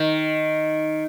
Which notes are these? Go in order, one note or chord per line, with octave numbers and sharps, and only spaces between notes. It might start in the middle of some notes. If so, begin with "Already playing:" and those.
Already playing: D#3